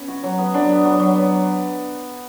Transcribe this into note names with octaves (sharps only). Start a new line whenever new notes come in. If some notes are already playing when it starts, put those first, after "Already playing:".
Already playing: B3 C#4
F#4
F#3
B3
F#3 D4
B3
F#3
F#3
B3